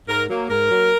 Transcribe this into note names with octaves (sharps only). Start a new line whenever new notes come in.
G#2 A#4
F#3 A#3
G#2 A#4
F#3 A#3